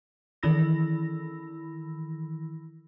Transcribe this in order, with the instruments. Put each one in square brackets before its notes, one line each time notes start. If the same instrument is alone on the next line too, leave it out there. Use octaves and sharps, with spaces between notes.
[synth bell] D#3 E3 E4 B5 E6 A#6